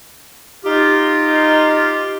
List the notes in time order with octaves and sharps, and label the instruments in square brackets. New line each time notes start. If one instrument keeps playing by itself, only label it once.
[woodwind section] D#4 F4 [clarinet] G4